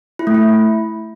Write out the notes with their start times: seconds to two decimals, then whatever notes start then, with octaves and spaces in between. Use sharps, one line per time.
0.19 E4
0.27 A3
0.34 E4